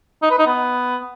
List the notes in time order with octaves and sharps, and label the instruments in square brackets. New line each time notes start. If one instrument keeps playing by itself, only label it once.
[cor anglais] D#4
B4
D#4
B3